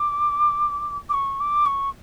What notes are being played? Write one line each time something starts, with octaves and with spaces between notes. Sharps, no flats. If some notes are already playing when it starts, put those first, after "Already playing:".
Already playing: D6
D6
C#6
D6
C#6